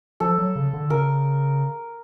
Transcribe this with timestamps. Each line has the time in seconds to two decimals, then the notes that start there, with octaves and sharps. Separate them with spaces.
0.20 F3 A4
0.38 F#3
0.56 C#3
0.73 D3
0.90 C#3 A#4